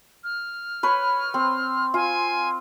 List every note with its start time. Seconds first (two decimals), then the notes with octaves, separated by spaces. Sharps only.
0.24 F6
0.83 B4 C#5
1.34 C4
1.94 F4 G#5